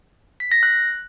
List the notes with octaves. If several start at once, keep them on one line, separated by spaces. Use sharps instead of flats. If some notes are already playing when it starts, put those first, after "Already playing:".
B6
A#6
F#6